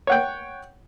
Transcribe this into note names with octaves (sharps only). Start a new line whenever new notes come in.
C#5 F#5 G5